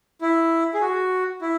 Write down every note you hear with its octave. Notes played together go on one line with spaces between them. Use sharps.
E4
G#4
F#4
E4